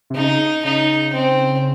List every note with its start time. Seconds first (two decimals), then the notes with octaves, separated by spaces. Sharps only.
0.10 C3
0.16 C#3 D#4
0.64 C#3 D#4
1.14 C4